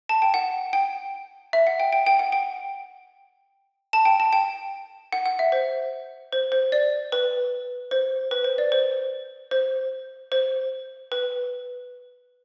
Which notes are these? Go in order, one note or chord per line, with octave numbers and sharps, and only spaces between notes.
A5
G5
F#5
G5
E5
F#5
G5
G5
G5
F#5
G5
A5
G5
A5
G5
F#5
F#5
E5
C5
C5
C5
D5
B4
C5
B4
C5
D5
C5
C5
C5
B4